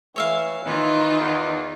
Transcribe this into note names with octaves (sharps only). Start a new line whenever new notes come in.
E3 C#5 E5 F5
D#3 E3 D#4 F4
E2